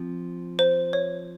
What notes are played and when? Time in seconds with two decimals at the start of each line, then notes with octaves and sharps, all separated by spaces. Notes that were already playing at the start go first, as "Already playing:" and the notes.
Already playing: F3 C4
0.59 C5
0.93 C#5